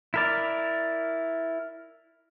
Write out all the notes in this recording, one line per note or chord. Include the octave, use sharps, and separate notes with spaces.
E4 A#4 D5